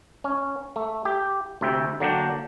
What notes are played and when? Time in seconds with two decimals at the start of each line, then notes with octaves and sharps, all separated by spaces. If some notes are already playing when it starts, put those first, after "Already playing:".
0.24 C#4
0.76 A3
1.05 G4
1.61 D2 C3 E5 G5
2.00 D3 F#3 A#3 D4 G5